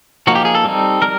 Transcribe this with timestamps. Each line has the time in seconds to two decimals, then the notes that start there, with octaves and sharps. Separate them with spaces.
0.27 F3 A#3 D#4 F#4
0.35 G4
0.45 G#4
0.55 A4
0.65 G3 C4 D#4
1.02 G3 A#4